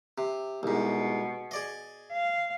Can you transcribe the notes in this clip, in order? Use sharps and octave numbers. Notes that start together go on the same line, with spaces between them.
C3
C2 G#2 B2
G#4 D5 D#5
F5